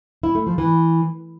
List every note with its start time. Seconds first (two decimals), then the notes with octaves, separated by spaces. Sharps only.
0.23 E4
0.35 A3
0.47 F3
0.58 E3